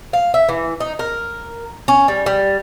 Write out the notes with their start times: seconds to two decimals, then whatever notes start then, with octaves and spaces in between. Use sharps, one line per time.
0.13 F5
0.34 E5
0.49 E3
0.80 D#4
0.99 A#4
1.88 C#4
2.08 G3
2.26 G3